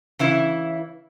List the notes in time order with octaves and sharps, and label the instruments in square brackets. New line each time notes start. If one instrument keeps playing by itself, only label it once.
[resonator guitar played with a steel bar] C#3 E3 E4